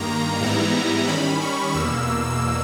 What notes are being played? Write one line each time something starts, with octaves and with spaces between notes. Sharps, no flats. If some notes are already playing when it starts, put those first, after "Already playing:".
Already playing: G2 D#3 A#3 A#5
G#2 E3 G3 B3 E4 A#5
D#3 G3 C#4 B5
C#6
E2 B2 A#3 E6
E6